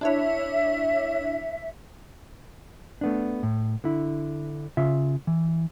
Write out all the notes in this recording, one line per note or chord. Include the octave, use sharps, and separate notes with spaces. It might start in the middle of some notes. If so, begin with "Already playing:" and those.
D4 E4 C#5 E5
A3 B3 D4
A2
D3 E4
C#3 F4 E5
E3